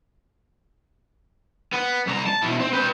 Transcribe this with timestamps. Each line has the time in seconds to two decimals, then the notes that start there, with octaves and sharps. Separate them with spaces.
1.73 B3
2.07 C2 A#5
2.26 A5
2.43 B2 E4
2.60 C4
2.73 B4 G5